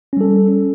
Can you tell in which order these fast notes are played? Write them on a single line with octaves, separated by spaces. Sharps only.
C#4 G3 A4